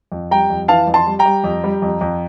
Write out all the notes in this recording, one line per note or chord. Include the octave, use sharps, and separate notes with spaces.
F2
G3 G5 A#5
F2
E3 F5 A5
F2
A5 C6
G3
G5 A#5
G3
F2
G3
F2
F2